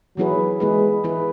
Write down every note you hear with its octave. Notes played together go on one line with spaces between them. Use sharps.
E3 F#3 B3 E4 G#4 B4
E3 G#3 B3 E4 G#4 B4
E3 B3 E4 G#4 B4